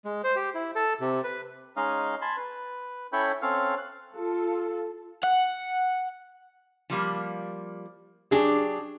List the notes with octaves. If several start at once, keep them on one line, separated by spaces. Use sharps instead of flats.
G#3
C5
G4
E4
A4
C3
B4
G#3 C#4 D#4 D#5 F5
G#5 A5 B5 C6
B4
C#4 E4 A4 C#5 G5 B5
C4 C#4 A4 F5
F#6
F4 A4
F#5
F3 G3 A#3
F#3 D4 G4 G#4